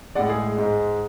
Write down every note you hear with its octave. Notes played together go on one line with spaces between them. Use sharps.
A2 G#3 D5 F#5
G#4
G#2 G#3